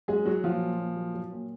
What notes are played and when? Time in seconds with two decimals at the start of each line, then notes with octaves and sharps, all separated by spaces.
0.08 F#3 G#3 G#4
0.25 F#3 F#4
0.44 A#2 F3 F4
0.62 A#2
0.79 A#2
0.96 F#3
1.14 F#3
1.32 A#2